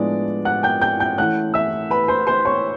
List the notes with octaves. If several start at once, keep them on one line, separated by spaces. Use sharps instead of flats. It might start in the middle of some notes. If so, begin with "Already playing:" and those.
Already playing: A2 F3 G#3 B3 D4 D5
F#5 F#6
G5 G6
G5 G6
G5 G6
E3 A3 C#4 F#5 F#6
E5 E6
B4 B5
C5 C6
C5 C6
C#5 C#6